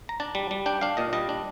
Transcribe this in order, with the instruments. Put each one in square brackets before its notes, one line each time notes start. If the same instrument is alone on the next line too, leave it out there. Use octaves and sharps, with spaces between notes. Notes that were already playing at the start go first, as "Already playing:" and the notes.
[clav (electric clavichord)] A#5
D4 A5
G3
G3
D4 G5
D4 F5
A#2 D#5
G3 D#5
D4